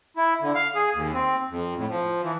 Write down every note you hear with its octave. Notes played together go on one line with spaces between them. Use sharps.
E4
D3
F5
G#4
D#2
C4
F2
A2
F3
E3